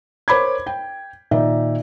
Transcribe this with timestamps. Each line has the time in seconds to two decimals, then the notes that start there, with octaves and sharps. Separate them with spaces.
0.28 A#4 C5 C#5 B5 D6 G#6
0.67 G5
1.31 A#2 D#3 D#4 D5 E5